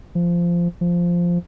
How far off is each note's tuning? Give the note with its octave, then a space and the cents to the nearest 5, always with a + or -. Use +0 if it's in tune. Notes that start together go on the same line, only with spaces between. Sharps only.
F3 -15
F3 -5